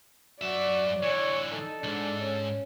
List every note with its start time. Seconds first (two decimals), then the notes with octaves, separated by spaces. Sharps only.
0.42 F#2 F#4 D5 E5
1.03 D3 E3 C#5 D5
1.52 D#4 A4
1.84 B1 G#2 D4
2.22 C#4